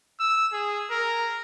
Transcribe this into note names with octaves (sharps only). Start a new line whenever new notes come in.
E6
G#4
A#4